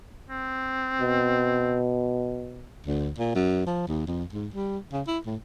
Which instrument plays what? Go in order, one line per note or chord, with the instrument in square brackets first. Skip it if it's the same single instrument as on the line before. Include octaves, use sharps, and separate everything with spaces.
[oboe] C4
[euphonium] B2
[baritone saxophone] D2
A#2
F#2
F3
D#2
F2
G#2
G3
C#3
E4
A2